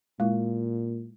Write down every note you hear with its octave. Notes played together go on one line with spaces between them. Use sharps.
A#2 G#3 E4